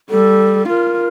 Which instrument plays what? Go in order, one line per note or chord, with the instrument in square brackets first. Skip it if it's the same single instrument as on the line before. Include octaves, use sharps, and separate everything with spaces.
[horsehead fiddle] G3 [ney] A4
[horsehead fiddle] F4 [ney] A#4